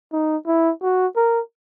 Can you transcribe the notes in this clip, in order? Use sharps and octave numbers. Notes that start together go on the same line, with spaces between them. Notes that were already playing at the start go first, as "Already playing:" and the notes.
D#4
E4
F#4
A#4